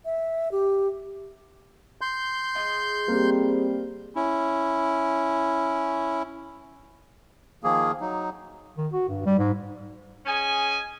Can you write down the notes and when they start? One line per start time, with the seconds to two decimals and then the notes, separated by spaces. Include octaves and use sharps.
0.05 E5
0.52 G4
2.01 C6 G6
2.55 G#3 F4 G#4
3.08 G3 A#3 C4 G4
4.15 C#4 E4
7.64 D#3 F3 A#3 G#4
8.00 F#3 D#4
8.78 D#3
8.93 F#4
9.09 G2
9.26 G3
9.39 G#2
10.26 C#4 G#4 D#5 G#5